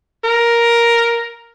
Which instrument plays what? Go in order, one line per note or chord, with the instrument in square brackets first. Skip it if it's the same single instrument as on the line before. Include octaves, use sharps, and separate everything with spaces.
[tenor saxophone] A#4